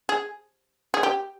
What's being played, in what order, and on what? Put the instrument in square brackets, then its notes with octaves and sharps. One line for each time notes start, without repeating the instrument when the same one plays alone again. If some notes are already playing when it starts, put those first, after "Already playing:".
[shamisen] G#4
G#4
G4